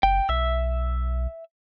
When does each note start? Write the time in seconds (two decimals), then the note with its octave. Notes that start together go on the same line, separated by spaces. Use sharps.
0.03 F#1 G5
0.29 B1 E5 E6